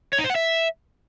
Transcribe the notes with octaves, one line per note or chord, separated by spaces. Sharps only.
C#5
D#4
C5
F#5
E5